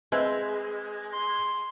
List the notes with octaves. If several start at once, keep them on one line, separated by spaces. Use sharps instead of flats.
G#3 C4 B4 E5
C6